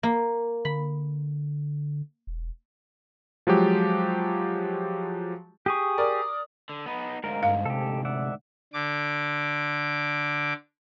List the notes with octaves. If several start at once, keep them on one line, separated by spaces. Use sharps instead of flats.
A#3
D3 B5
E1
F3 F#3 G#3 G4
G4 G#4 C#6 D#6
A#4 D5
D3
B3 D#4 B5
D2 G#2 A#4 F5
G2 F5
C3 G4 A4
D5 E5 F#5
D3 D6